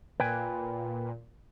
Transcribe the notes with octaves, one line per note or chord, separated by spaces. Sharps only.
A#2 B4 G5 G#5